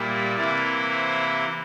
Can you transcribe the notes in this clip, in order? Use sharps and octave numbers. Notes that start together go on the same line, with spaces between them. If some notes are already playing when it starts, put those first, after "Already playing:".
Already playing: A#2 G3 A#3 E4
C3 E3 A#3 E4 D5
C5